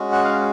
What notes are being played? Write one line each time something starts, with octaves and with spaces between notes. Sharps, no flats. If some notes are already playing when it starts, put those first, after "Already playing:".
Already playing: G#3 C#4 F#4
F#5
F5